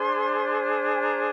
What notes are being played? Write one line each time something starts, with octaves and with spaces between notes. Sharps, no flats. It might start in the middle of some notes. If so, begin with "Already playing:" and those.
Already playing: D4 G#4 C5 C6
G#5
A#5